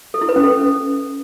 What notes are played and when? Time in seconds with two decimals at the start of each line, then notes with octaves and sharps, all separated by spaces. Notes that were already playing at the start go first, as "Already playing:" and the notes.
0.14 A4
0.21 E4
0.29 B4
0.36 C#4
0.43 A4